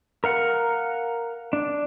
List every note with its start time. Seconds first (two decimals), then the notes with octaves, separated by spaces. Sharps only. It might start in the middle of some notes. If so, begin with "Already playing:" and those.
0.24 A#4 F5 F#5
1.53 D4